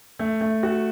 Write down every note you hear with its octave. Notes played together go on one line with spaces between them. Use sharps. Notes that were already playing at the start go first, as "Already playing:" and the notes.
A3
A3
F#4